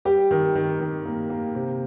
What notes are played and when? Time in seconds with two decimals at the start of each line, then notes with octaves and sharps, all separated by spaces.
0.05 G3 G4
0.31 D#3
0.55 D#3
0.80 D#3
1.05 A#3
1.30 A#3
1.55 C3